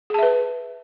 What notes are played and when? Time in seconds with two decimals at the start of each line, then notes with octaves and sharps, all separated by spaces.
0.10 G#4
0.14 A5
0.18 E5
0.23 B4